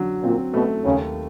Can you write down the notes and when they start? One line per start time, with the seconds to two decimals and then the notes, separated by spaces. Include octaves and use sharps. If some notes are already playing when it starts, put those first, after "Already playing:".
Already playing: D3 F#3
0.23 A#2 C4
0.54 B2 A3
0.85 D#2 C#3